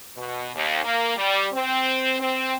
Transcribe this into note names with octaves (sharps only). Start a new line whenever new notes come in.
B2
D#2
A#3
G3
C4
C4